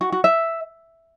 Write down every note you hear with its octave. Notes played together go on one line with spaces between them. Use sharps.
F#4
F#4
E5